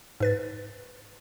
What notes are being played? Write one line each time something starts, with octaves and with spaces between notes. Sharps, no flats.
G#2 B4 A6